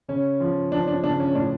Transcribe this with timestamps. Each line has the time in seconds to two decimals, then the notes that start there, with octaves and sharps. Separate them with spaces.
0.08 C#3 C#4
0.40 F3
0.72 F3 D4
0.88 D4
1.03 C#3 D4
1.20 C#4
1.35 A2 D4